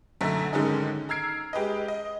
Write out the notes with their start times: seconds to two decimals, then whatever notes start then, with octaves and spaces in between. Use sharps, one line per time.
0.21 B1 F#2 D3 A3 A#5 B6
0.53 G#2 D3 D#3 G#3 C#4 D#4
1.09 A#5 E6 F6 G#6 C7 D7
1.53 G#3 G4 B4 D#5
1.88 D#5